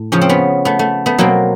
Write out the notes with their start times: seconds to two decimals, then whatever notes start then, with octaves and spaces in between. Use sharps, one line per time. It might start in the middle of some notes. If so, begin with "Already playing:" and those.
Already playing: A2
0.12 C#3 F3 C#4
0.21 C4
0.29 B3 C#4
0.65 A3 B3
0.79 A3
1.06 A3 B3
1.18 B2 F#3 A#3 C4